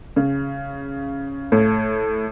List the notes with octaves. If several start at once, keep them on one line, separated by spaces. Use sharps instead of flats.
C#3
A2